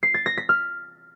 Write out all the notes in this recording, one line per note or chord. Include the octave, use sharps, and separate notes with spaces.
C7
A6
A#6
B6
F6